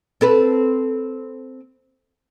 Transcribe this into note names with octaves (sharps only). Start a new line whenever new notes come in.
C4 A4 B4